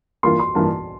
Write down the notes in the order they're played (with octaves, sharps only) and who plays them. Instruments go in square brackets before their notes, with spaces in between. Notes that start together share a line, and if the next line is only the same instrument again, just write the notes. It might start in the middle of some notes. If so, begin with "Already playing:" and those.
[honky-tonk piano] G2 E3 A#3 F4 A#4 [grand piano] C6
[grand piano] C6
[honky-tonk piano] G2 E3 A#3 F4 A#4 [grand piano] A5